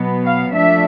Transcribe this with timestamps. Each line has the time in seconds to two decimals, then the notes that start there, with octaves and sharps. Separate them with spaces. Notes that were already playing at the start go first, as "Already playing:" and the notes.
Already playing: B2 F#3 B3
0.24 F5
0.54 F3 A3 D4 E5